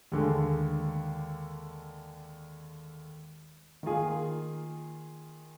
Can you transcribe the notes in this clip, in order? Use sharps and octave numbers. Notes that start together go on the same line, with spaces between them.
D#2 D3 G#3
D#3 A#3 F4 G#4